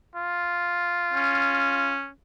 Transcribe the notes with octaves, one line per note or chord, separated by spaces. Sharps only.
F4
C#4